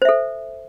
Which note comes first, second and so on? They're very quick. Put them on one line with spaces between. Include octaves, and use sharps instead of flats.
C5 E5 A4